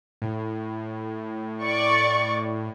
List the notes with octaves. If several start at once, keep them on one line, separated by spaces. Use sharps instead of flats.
A2
D5 C#6